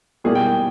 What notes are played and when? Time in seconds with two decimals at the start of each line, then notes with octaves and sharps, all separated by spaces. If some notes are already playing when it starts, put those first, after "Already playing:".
0.24 B2 G3 A#3 E4 G#4
0.35 G5
0.47 G5